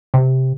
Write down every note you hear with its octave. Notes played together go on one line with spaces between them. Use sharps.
C3